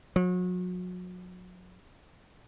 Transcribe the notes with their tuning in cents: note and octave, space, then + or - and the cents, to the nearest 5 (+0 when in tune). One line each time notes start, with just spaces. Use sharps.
F#3 -35